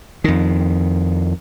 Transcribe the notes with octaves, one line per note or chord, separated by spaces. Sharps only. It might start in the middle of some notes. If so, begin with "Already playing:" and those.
F2 D#3